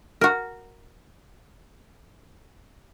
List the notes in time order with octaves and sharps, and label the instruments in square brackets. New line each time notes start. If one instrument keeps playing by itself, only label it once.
[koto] F#4 A#4